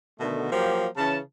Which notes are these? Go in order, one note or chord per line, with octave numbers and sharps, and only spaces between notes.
B2 D3 D#3 A3
F3 F#3 A#3 G4
C#3 E3 C#4 A5